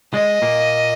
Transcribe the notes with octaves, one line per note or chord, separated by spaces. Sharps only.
G#3 D#5
A#2 A#3